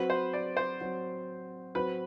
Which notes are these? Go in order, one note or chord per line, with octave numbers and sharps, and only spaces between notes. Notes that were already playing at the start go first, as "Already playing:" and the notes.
Already playing: F#3 C4 F#4 B4
C5
D5
C5
F#3 C4 F#4
F#3 C4 F#4 B4